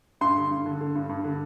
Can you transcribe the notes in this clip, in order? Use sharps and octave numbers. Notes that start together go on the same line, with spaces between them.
G2 C6
D3
G2
D3
D3
G2
G2
D3